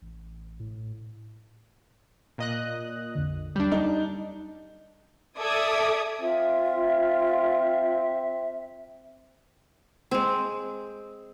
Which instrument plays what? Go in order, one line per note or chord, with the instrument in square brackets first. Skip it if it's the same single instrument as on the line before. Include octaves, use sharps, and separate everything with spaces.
[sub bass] A1
A2
[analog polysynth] A#2 D#5 F#6
[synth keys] A#1 F2 D3
[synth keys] D#2 F#3 G6 [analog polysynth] G3 D4
[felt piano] D#4 [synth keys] D#5
[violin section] A4 D5 E5 D6 D#6 G#6
[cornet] C4 [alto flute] F4 [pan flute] E5
[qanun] G#3 C4